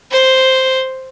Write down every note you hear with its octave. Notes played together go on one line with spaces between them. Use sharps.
C5